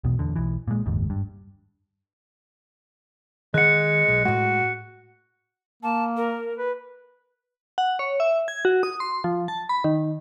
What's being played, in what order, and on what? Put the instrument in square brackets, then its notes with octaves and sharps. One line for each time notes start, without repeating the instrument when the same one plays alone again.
[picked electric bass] B1 E2 B2
E2 D3
B1 E3
A#2 G#3
F#1 D#2 G#2
G2
[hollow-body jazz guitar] D#3 F#5 [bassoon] G#3 [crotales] F#6 C#7
[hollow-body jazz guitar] B1
[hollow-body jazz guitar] A2 G#3 [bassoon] F#4
[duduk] A#3 [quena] A5
[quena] A#4
[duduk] B4
[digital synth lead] F#5
C#5
E5
G#6
F#4
D#6
C6
F3
A5
B5
D#3